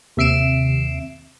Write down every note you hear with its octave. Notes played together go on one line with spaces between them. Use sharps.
D#2 C3 E5 C7 D7 E7